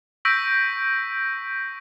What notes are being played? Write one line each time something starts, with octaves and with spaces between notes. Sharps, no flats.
C#6 E6 G6 A#6 B6 D7